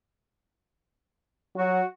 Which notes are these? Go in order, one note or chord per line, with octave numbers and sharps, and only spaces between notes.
F#3 F#4